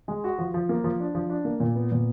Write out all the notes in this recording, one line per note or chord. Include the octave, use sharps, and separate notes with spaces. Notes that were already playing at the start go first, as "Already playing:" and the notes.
G#3
F#4
F3
F3
A#3
F3
D4
F3
D4
A#3
A#2
B3
A#2